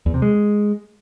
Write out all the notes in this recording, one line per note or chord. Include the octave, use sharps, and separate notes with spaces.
E2
C3
G#3